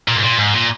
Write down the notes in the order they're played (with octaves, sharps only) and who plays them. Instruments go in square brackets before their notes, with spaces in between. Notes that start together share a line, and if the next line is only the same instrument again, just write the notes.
[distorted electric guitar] A#2
G#2
A#2
G#2
A#2